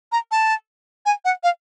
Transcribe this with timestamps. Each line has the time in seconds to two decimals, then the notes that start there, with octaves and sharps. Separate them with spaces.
0.12 A#5
0.31 A5
1.06 G#5
1.25 F#5
1.43 F5